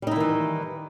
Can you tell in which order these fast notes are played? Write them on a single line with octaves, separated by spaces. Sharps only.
G3 D#4 E4 D#3 E3